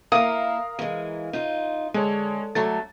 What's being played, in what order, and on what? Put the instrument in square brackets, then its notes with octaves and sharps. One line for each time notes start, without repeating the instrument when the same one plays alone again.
[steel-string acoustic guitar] A#3 E4 [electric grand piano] A#4 F5 A#5 [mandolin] D#6
[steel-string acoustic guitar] E3 G#3
D#4 F4
[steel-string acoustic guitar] D3 [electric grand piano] G#3 C#5
[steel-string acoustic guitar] D3 F#3 A3 [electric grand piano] A6